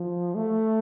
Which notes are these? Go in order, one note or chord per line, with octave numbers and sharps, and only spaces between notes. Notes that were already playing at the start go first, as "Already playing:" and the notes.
Already playing: F3
A3